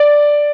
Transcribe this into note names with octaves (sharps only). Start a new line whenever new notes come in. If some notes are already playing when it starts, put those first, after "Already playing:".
Already playing: D5